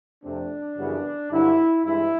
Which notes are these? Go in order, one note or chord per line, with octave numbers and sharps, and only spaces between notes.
F2 C3 F3 A3 C4 D4
F#2 C#3 E3 G3 B3
G2 D3 F#3 E4
G2 E3 G#3 E4